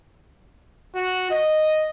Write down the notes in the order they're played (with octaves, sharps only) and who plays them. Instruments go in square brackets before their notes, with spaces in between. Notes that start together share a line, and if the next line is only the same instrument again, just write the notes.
[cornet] F#4
D#5